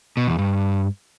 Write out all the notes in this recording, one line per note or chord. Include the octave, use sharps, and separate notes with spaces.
B2
E2
G2